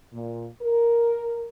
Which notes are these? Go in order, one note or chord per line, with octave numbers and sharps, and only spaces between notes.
A#2
A#4